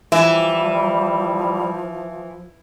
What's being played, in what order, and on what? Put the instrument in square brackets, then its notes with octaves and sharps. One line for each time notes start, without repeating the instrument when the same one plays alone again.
[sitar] E3 [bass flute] F3 [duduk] G3 [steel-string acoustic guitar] E5